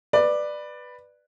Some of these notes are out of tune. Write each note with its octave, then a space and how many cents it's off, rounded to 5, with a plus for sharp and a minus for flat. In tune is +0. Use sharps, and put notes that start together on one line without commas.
B4 +0 D5 +15